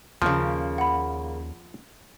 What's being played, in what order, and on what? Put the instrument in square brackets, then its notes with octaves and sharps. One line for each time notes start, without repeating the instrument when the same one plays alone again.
[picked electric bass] D#2 B3 C#4 [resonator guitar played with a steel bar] C#3 A#3 [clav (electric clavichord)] F3
[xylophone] F#5 B5